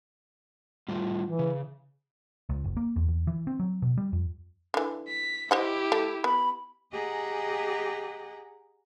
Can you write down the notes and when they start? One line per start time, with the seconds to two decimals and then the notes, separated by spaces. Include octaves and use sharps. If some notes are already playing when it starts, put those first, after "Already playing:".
0.88 A2 G3 F4
1.26 E3
1.39 C#3
2.49 C#2
2.64 F#1
2.77 A#3
2.96 E2
3.08 E2
3.27 E3
3.47 C4
3.60 F#3
3.82 B2
3.97 G3
4.13 F2
4.74 D3 E3
5.08 B6
5.51 E4 G4 C5 D#5 F#5
5.92 A3
6.24 B3 B5
6.93 G4 G#4 D#5 F#5 G#5 A#5